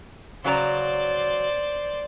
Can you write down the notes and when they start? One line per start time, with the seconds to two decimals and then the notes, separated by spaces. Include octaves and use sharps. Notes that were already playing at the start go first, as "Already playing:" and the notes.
0.44 C#3 F#3 C5 D5 A#5